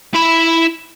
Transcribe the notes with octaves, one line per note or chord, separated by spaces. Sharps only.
E4 B5